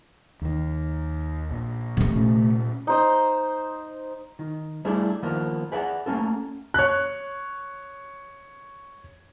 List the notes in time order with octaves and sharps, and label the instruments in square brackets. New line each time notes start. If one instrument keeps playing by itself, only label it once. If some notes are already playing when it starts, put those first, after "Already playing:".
[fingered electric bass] D#2 D#3
A#1
[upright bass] C3 A3
[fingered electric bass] A#2 C#4
[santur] D#4 C5 D#5
[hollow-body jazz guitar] D#3
G3 A3 D4 E4 G#4
D#3 F3 A#3 B3
G#4 B4 D5 E5 F#5
A3 A#3 C4 C#4 A4
[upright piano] C#5 F#6